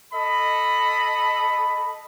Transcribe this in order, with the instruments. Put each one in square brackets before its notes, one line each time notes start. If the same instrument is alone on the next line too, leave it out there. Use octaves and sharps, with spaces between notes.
[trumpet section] A4 D#5 B5